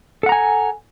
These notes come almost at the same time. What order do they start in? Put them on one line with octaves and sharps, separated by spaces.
A4 F#5 A#5 G#5